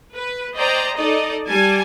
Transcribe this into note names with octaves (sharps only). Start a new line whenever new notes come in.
B4
C5 D5 D#5 G5 A#5
D#4 A4 D5 D#5
G3 G#5 A5